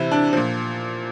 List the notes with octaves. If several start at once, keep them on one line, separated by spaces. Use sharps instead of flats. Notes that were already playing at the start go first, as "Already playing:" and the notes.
Already playing: C3 E3 E4
D4
A#2 F3